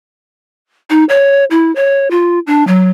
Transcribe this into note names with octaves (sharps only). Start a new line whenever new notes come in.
D#4
C#5
E4
C#5
F4
D4
F#3